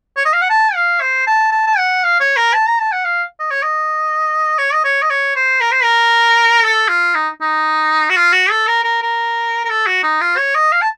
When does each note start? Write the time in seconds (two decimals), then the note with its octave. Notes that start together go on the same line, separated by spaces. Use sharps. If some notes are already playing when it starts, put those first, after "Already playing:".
0.17 C#5
0.25 D#5
0.33 F5
0.42 F#5
0.50 A5
0.75 F5
1.01 C5
1.27 A5
1.52 A5
1.67 A5
1.78 F#5
2.04 F5
2.20 C#5
2.37 A#4
2.54 A5
2.67 A#5
2.81 A5
2.92 F#5
3.05 F5
3.40 D#5
3.51 C#5
3.63 D#5
4.59 C#5
4.74 D#5
4.84 C#5
5.02 D#5
5.10 C#5
5.36 C5
5.61 A#4
5.72 C5
5.83 A#4
6.63 A4
6.89 F4
7.15 D#4
7.41 D#4
8.10 F#4
8.16 F4
8.33 F#4
8.51 A4
8.67 A#4
8.84 A#4
9.02 A#4
9.65 A#4
9.69 A4
9.87 F#4
10.03 D#4
10.21 F4
10.37 C#5
10.55 D#5
10.72 F5
10.82 A5